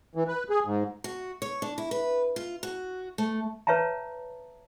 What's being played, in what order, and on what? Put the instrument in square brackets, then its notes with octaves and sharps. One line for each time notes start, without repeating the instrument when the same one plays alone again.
[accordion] E3
B4
G#4
G#2
[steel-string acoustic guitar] F#4
C#5
D4
E4
B4
F4
F#4
A3
[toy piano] B4 C#5 E5 A5 A#5